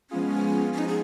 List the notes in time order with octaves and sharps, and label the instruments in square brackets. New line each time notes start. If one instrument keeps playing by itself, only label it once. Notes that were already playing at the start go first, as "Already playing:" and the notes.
[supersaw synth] F3 G#3 B3 F4 G#4 [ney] C#4
[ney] C#4
D#4
G#4